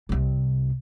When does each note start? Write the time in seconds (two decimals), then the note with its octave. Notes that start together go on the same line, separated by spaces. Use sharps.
0.09 C2 C3